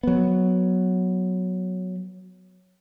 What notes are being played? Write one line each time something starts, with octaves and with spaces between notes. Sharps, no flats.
F#3 B3